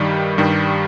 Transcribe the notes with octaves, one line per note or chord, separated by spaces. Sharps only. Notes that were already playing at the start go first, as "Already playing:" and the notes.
Already playing: G2 D#3 G3
G2 D#3 G3